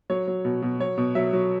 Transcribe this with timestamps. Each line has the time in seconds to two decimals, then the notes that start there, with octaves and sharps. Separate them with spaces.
0.10 F#3 C#5
0.27 F#3
0.45 B2
0.62 B2
0.80 F#3 C#5
0.98 B2
1.15 F#3 E5
1.33 F#3